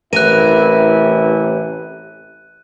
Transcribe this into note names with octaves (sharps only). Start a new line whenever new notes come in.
A1 C3 E4 A#4 F#6 D#7